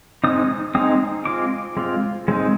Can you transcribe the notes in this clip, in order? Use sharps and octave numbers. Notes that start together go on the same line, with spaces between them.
G#3 C4 D#4 D#6
G#3 C4 D#4 D#6
G#3 C4 F4 D6
G#3 C4 F4
G#3 C4 D#4